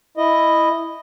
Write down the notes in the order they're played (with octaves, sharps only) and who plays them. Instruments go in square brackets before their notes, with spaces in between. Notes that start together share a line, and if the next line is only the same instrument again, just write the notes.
[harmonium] E4 D#5